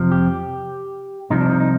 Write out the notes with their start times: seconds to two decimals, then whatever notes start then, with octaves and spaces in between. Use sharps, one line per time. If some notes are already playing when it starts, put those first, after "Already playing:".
Already playing: F2 C3 F3
0.12 G4
1.30 C2 C3 F3 D#4
1.40 D4
1.50 D#4
1.60 D#4